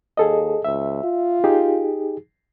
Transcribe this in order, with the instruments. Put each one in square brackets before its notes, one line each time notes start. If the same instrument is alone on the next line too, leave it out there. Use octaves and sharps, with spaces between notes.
[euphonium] D#2 [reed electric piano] G#4 A4 D#5
[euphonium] C#2 [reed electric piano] E5
[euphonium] F4
[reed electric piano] D#4 G4 G#4